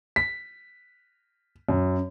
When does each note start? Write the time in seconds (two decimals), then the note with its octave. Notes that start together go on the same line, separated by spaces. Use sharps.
0.16 B6
1.69 F#2